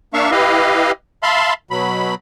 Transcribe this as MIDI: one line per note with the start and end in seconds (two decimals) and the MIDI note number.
0.14 0.31 58
0.14 0.31 62
0.14 0.31 76
0.14 0.31 77
0.14 0.31 85
0.31 0.92 64
0.31 0.92 67
0.31 0.92 71
0.31 0.92 75
0.31 0.92 77
1.23 1.53 76
1.23 1.53 77
1.23 1.53 81
1.23 1.53 83
1.23 1.53 84
1.71 2.15 47
1.71 2.15 54
1.71 2.15 83